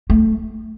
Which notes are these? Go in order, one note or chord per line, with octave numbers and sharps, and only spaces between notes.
A3